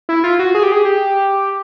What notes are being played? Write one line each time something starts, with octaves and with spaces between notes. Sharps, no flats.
E4
F4
F#4
G#4
G4
G#4
G4